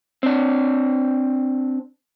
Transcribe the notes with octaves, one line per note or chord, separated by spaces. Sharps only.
C4 D4